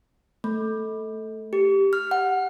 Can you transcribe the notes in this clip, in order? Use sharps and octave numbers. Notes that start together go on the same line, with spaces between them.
A3
G4
F6
F#5